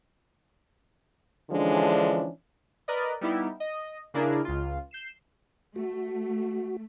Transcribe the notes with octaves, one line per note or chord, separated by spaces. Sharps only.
D3 E3 F3 G#3 C#4 D4
A#4 B4 D5 D#5
G3 B3 D#4 E4 G4
D#5
C#3 A#3 D4 E4 G#4 A#4
C#2 F4
G6 C7 E7
A3 F#4